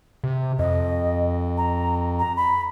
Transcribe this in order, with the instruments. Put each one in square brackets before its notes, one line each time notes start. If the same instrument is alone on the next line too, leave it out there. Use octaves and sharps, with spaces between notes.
[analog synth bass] C3
[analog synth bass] F2 [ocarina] D#5
[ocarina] A#5
A#5
B5